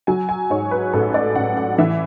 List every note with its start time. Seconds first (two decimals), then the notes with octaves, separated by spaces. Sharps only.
0.07 F#3 G#5
0.29 G#5
0.50 G#2 C#5
0.71 B4
0.93 A1 A4
1.14 D5
1.35 A1 F#5
1.57 F#5
1.78 E3 E5